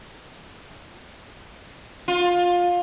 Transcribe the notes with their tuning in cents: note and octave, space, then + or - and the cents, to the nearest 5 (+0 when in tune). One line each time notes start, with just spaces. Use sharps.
F4 +20